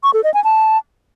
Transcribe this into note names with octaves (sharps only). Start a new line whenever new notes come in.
C#6
A4
D#5
G#5
A5